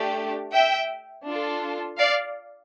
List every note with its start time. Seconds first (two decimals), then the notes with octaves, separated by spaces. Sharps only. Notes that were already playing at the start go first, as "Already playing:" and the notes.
Already playing: A3 D4 G4
0.53 E5 G5
1.26 D4 F4 A4
1.99 D5 F5